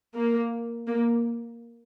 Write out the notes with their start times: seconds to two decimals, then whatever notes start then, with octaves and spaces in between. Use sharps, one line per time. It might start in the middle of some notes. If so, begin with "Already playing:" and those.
0.15 A#3
0.87 A#3